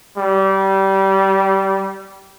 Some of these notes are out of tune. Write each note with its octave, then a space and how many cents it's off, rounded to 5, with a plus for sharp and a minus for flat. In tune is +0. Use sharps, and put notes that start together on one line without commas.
G3 -20